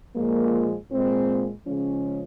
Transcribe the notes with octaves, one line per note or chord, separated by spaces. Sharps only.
A#2 F3 G#3 A#3
A#2 G#3 C4
C#3 F3 G#3 C#4